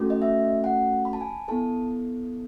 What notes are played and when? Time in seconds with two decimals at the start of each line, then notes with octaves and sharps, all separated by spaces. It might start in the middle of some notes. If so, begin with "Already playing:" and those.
Already playing: A3 C#4 F#4 A4
0.10 D#5
0.22 E5
0.64 F#5
1.05 B5
1.13 A5
1.21 G#5
1.48 B3 E4 A4 A5